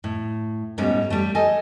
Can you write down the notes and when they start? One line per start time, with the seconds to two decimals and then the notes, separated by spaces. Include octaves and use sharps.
0.04 A2
0.78 G#2 B2 G3 A3 C#4
1.10 G3 A3
1.35 A4 D#5 G#5